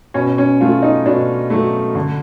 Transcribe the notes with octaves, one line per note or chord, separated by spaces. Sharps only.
B2 C#4
C#4
F#3 A3 F4
D#4
B2 D4
F#3 A3
D3